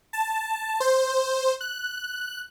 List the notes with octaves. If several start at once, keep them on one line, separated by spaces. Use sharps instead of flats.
A5
C5
F#6